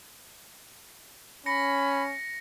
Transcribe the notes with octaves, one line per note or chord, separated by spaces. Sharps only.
C#4 B5 A#6 C#7